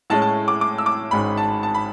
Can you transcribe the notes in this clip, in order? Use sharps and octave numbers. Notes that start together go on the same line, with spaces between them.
A2 G#3 C#4 A5
A5
D6
D6
E6
D6
G#1 G#2 G#3 C#4 B5
A5
A5
B5